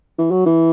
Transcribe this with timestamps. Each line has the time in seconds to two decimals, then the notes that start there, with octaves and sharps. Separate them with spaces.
0.18 E3
0.31 F#3
0.46 E3